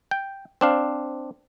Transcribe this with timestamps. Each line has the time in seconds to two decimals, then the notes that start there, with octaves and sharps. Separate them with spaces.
0.11 G5
0.61 C4 D4 F5